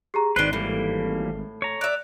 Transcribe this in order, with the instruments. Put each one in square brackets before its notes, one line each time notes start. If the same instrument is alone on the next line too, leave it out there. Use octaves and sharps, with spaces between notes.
[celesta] G4 G#4 A#5
[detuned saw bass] G#1 [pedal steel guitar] D#3 B4 [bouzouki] D4 C5 [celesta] C7 G7
[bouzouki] A2 [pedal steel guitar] E3 G3 A#3
[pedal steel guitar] C#5 A#5
[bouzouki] D5 E5 [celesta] F#6 F7